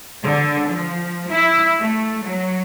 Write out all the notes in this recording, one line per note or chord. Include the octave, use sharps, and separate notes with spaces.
D3
F3
E4
A3
F#3